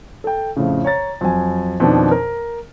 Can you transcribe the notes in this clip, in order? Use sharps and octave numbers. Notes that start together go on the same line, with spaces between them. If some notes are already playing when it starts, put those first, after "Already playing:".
A4 G5
F2 A2 C#3
C#5 A#5 A6
F2 F#3 G#5
F2 B2 D#3 D4
A#4